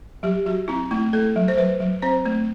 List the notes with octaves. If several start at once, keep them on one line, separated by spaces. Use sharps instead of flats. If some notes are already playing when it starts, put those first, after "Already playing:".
F#3 G4
F#3 F#4
C4 E4
A3 E4
A3 A4
F#3
C5
F#3 B4
F#3
C4 C5
A3